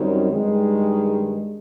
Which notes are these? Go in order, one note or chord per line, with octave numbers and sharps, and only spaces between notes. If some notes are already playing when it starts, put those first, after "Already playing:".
Already playing: F#2 D#3 G3 C4 D#4
G2 D#3 G#3